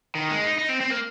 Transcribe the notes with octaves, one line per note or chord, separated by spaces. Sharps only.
D#3
G#3
D#4
D#4
C4
C4
A#3